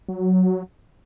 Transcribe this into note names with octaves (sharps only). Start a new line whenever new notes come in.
F#3